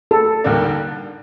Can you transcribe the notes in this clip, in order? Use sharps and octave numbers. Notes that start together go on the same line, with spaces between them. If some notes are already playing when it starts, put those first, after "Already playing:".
A4
D#2 D3 G3 A#3 D4